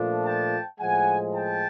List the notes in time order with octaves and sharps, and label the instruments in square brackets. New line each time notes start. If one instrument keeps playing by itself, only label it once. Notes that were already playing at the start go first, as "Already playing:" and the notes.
Already playing: [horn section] A#2 F3 A3 D4
G5 A5
A2 F3 G#3 F#5 G#5
G5 A5